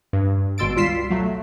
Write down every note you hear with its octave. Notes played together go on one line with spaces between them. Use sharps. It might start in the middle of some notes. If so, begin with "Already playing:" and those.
G2
G#1 B2 C6 E6 A6 D7
C#2 G3 F4 B6 C7 E7
F#3 A3 F#4